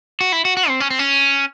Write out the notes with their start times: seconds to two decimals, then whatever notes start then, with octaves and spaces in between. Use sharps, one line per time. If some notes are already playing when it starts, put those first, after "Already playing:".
0.21 F#4
0.32 E4
0.45 F#4
0.57 F#4
0.69 C4
0.80 C#4
0.90 C4
0.99 C#4